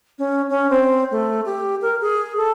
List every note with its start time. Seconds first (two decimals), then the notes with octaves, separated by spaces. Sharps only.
0.19 C#4
0.50 C#4
0.70 C4
1.11 A3
1.46 G4
1.82 A#4
2.01 G#4
2.37 A4